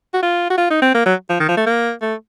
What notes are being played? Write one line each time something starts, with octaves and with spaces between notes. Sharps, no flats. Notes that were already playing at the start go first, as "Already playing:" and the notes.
F#4
F4
F#4
F4
D#4
C4
A#3
F#3
F3
D#3
F3
A3
A#3
A3